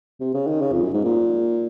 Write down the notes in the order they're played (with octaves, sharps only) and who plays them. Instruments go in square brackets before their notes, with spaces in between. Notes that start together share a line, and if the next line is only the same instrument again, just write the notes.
[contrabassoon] C3
C#3
D#3
C#3
F2
F#2
G#2
A#2